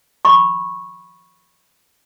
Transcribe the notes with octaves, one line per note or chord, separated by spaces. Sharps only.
B5 C#6